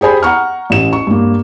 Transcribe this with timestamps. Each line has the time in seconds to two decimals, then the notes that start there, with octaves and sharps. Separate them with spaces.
0.01 G4 G#4 C5 G#5 B5
0.23 F#5 A#5 C#6 F6
0.70 A1 E7
0.93 C#6
1.07 G2 A#3